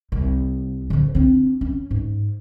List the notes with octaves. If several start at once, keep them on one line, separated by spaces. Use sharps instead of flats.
C2
D3 F3
C4 D4
C#4
G#2